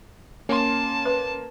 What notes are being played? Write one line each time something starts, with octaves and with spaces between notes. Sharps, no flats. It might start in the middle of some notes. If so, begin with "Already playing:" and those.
A#3 C#4 A5 C6
B4